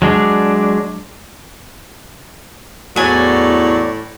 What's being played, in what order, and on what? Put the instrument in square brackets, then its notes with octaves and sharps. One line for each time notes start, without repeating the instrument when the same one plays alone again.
[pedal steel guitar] F#3 G#3 D4
[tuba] E2 [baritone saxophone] A2 [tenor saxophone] F#3 [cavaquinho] D5 G#5